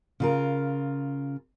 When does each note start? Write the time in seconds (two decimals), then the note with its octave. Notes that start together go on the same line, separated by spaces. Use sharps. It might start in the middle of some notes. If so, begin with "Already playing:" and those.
0.20 C#3 F4 A#4